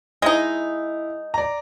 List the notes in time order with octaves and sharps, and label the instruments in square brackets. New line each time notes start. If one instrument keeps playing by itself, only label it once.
[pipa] G#3 D#4 [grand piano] E4
[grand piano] D5 A#5